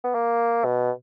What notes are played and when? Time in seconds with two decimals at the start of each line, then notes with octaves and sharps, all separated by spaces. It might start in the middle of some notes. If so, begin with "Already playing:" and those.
0.04 B3
0.15 A#3
0.65 B2